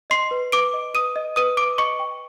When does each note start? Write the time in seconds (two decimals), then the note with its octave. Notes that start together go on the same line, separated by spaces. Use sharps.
0.10 D#5 C6 C7
0.31 B4
0.52 B4 D6 D7
0.73 D#5
0.94 B4 D#6 D#7
1.16 D#5
1.36 B4 D#6 D#7
1.57 B4 D6 D7
1.78 D#5 C#6 C#7
1.99 G5